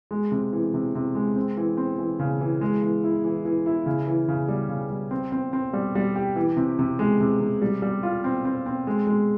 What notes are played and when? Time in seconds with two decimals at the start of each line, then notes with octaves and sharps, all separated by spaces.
0.11 G#3
0.32 C3
0.53 E3
0.74 C3
0.95 C3
1.15 G#3
1.36 C4
1.57 E3
1.77 C4
1.98 E3
2.19 C#3
2.41 E3
2.61 G#3
2.82 E3
3.04 E4
3.24 E3
3.45 E3
3.66 E4
3.86 C#3
4.07 E3
4.28 C#3
4.48 G3
4.69 C#3
4.90 G3
5.11 C4
5.32 C4
5.53 C4
5.73 G3
5.95 G3
6.16 G4
6.36 E3
6.57 C3
6.79 C3
6.99 G#3
7.20 C3
7.40 C3
7.62 G3
7.82 G3
8.03 F4
8.24 C4
8.45 C4
8.66 C4
8.87 G#3
9.07 G#3